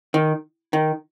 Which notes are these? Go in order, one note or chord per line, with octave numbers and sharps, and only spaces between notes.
D#3
D#3